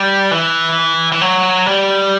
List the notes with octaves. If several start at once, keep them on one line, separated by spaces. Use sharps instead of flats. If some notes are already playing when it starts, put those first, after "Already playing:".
Already playing: G3
E3
E3
F#3
G3